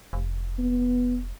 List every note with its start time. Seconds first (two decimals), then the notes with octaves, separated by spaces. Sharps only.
0.13 F1
0.59 B3